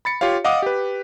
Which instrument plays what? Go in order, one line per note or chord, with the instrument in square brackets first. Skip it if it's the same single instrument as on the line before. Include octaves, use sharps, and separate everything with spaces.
[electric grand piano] B5 A6 C#7
F4 G4 C#5 F5
D#5 F5 F#5 D6 D#6
G4 B4